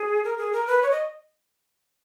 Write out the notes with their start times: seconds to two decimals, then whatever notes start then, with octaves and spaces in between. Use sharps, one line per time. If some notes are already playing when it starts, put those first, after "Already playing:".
Already playing: G#4
0.24 A#4
0.38 G#4
0.53 A#4
0.67 B4
0.83 C#5
0.91 D#5